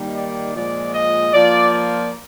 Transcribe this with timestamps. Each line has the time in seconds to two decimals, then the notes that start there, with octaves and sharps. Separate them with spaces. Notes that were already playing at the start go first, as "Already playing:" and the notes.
Already playing: D#3 G3 A#3 D#4
0.14 D5
0.54 A#2 F3 G#3 D5
0.94 D#5
1.33 F3 A#3 F4 D5
1.73 D5